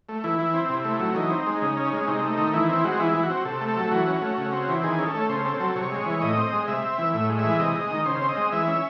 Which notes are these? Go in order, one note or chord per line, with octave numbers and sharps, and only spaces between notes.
A3
E3 E4
E3
C4
C3
A3
F#3
E3 D#4
C4
G#3
C#3
C#4
G#3
C3 D#4
A3
D#3
E3 E4
C4 E4
G#3 F#4
E3 E4
E3
F#4
C4
C3 A4
A3
A4
F#3
E3 F#4
C#4
A3
C#3
C4
E3
D#3 G#4
C#4
A4
A3
C#3 C5
C4 A4
F#3 A4
C3 C#5
G#3
E3 C#5
A2 D#5
C4
G#3
C3 E5
C4
E3
A2 E5
G#3
E5
E3
C3 D#5
G#3
D#3
C#3 C5
C4
D#5
G#3
E3 E5
C#4